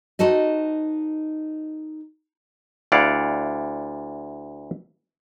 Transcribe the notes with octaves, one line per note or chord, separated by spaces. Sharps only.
D#4 F#4 A4 C5 D#5
D2 E4 D5 F5 F#5